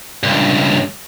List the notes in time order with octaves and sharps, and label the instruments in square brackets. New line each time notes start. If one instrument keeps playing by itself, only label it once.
[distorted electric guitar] C#2 G2